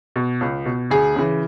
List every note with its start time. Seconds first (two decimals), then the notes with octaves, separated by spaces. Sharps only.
0.16 B2
0.41 C#2
0.66 B2
0.90 D2 G#4
1.16 C#3 E3